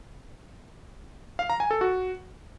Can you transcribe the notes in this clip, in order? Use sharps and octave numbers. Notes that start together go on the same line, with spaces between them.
F5
A#5
G#5
A4
F#4